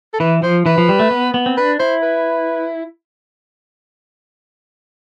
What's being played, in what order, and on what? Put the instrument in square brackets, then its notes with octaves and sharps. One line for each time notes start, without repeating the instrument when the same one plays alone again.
[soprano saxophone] A4
[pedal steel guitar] E3 [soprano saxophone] B4
[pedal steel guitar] F3 [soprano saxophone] C5
[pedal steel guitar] E3 [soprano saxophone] B4
[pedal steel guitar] F3
G3
A3
B3
B3
C4
[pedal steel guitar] D4 [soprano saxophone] B4
[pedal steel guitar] E4 [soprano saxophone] C5
[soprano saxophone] B4